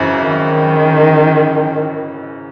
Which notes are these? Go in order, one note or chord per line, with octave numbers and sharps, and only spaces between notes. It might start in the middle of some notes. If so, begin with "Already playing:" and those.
Already playing: G#1 F#2 C#3 E3
D#3